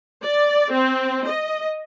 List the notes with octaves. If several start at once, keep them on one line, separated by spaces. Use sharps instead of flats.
D5
C4
D#5